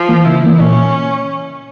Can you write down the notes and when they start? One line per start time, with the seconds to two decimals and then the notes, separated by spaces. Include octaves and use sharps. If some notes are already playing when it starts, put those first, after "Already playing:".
Already playing: F3
0.09 E3 A#3
0.25 C#3 E4
0.43 E3 A#3
0.59 A#2 C#4